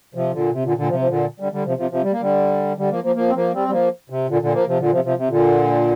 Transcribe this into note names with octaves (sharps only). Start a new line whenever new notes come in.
C3 F3
A#2 D3
C3
A#2 D3
A#2 D3
C3 F3
F3
A#2 D3
D3 G3
D3 G3
C3 F3
C3 F3
C3 F3
G3
A#3
D3 G3
D3 G3
F3 A#3
F3 A#3
F3 A#3
C4
F3 A#3
G3 C4
G3
F3 A#3
C3
A#2 D3
A#2 D3
F3 A#3
C3 F3
A#2 D3
C3 F3
C3 F3
C3
A#2 D3